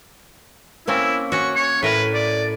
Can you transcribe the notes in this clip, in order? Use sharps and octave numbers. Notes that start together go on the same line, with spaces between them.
A#3 C4 C#4 E4
C#4 F#4 C#6
C#5
A2 A#4 B4
D5